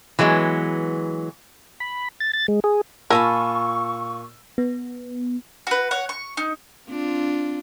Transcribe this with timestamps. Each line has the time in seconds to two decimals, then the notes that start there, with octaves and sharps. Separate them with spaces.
0.19 E3 F#3 G#3 B3
1.80 B5
2.20 A6
2.33 A6
2.48 G#3
2.64 G#4
3.10 A#2 F4 A#4 G#5 A5 B5 C#6 E6
4.58 B3
5.67 F#4 B4
5.91 C#5 F#5
6.09 C#6
6.37 D#4
6.88 C4 D4 F4